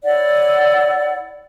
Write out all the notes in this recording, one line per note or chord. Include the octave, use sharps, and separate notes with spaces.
E4 C#5 D5 F#5